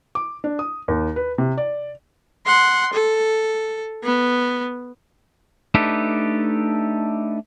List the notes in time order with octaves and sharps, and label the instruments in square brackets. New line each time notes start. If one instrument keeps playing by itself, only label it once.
[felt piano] D6
D4
D#6
D#2
B4
C3
D5
[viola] F#5 C6
A4
B3
[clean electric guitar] A3 D4 D#4 G4 A4 B4